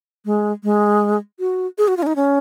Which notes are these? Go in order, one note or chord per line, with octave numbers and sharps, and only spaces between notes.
G#3
G#3
F#4
G#4
F#4
F4
C#4
D#4
C#4